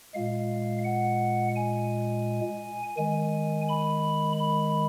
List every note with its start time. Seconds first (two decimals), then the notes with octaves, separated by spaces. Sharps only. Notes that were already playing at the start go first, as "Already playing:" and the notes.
0.14 A#2 G#3 F5
0.84 F#5
1.56 G#5
2.97 D#3 G#3 G#5
3.69 B5
4.40 B5